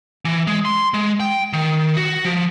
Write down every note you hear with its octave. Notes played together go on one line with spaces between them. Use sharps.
E3
G#3
C6
G#3
G5
D#3
F#4
F3